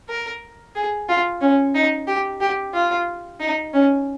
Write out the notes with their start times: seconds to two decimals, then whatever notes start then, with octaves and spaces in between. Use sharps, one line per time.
0.09 A#4
0.75 G#4
1.09 F4
1.41 C#4
1.75 D#4
2.07 G4
2.41 G4
2.74 F4
3.40 D#4
3.73 C#4